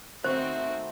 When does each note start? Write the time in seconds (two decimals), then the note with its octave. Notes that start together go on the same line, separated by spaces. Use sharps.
0.24 D#3 A3 B3 C4 F#4 C5 E5